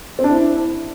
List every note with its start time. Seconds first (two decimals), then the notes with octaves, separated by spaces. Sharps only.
0.19 C4
0.24 D4
0.29 E4